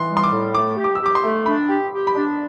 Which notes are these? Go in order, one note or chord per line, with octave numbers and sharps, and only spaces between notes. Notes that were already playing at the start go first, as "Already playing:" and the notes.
Already playing: E3 C6
G3
C6
D6
A2
A3 D6
G4
D6
E6
G4
D6
C6
A3
D4 B5
G4
G4
B5
D4